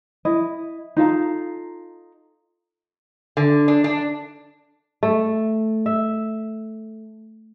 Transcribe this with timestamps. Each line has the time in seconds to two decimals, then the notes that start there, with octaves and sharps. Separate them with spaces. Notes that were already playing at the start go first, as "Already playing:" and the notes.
0.25 E4 D#5
0.97 D#4 F4 A4 A#5
3.37 D3
3.68 D4
3.84 D4
5.03 A3
5.86 E5